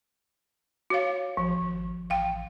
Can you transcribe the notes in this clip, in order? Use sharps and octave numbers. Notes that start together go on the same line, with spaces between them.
F#4 C#5 F5
A1 F3
G#1
A1 F5 G5